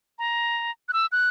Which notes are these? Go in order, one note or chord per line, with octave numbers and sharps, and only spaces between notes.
A#5
F#6
E6
F#6